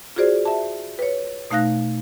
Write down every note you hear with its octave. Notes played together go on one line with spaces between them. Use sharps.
F4 F#4 G#4 C5 D5
E5 A5
B4 C#5
B2 A3 D#4 F5 F#6 A#6